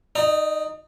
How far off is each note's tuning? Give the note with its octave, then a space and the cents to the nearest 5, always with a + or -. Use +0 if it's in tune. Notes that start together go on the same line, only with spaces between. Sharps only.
D#4 +0 D5 +40